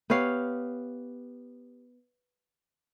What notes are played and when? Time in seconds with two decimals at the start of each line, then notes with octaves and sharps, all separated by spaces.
0.10 B3 G4 C#5 F5